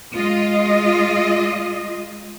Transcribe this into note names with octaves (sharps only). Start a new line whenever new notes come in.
G#3 F4 D#5